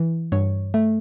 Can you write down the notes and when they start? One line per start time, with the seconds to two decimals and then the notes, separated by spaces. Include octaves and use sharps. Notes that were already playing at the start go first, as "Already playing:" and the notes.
Already playing: E3
0.32 G2 C#5
0.74 A3